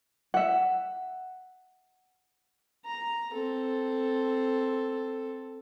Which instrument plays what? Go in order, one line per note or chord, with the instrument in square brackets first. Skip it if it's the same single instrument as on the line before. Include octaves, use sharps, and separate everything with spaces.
[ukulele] E5 F#5
[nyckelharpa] A#5
C4 A4